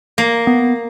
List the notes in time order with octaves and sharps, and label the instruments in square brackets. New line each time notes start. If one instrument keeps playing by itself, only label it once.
[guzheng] A#3
[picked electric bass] B3